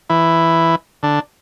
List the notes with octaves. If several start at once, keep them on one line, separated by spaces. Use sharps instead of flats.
E3 E4
D3 D4